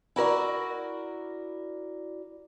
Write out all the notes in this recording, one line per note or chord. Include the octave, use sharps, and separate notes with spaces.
E4 F#4 A#4 D5